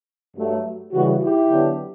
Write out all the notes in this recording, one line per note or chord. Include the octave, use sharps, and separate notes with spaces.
G2 F#3 A3
C#3 E3 G3 F#4
E4 G4
D3 F#3 B3 D4